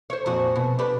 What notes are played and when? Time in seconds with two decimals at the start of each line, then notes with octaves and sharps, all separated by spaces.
0.10 C5 C#5
0.26 F2 A#2 F#4
0.56 B2
0.79 D4 G4 B4